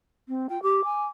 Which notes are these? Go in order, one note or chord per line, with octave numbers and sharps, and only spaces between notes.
C4
F4 G5
G4 D6
G#5